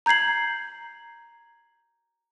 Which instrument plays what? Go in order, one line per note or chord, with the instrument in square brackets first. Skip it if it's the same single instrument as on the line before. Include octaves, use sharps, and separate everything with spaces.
[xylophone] A#5 G6 G#6 C7 F#7